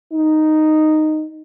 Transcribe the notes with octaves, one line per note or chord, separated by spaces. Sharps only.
D#4